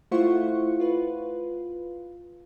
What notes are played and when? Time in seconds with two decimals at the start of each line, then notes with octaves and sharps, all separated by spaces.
0.11 A3 E4 F4 C5 F#5 C#6
0.80 F4 B4